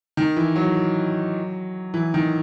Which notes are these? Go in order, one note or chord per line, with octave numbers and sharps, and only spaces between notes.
D#3
E3
F#3
E3
D#3